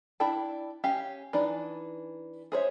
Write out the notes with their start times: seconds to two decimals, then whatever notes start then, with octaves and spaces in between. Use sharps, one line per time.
0.20 D4 E4 D5 G5 A5
0.84 C#4 G4 F5
1.33 E3 D4 D#4 D5
2.52 G#4 C5 C#5 E5